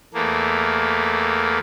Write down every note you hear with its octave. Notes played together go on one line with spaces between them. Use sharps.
E2 A3 A#3